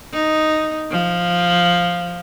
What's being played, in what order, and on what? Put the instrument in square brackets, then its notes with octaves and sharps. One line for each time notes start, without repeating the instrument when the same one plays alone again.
[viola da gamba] D#4
F3